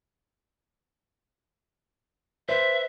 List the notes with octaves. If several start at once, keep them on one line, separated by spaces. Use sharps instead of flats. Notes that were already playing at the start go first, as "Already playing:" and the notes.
B4 C5 E5